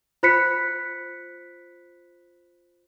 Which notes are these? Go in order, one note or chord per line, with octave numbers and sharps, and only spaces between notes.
F4 C5 B5 F#6 B6 C#7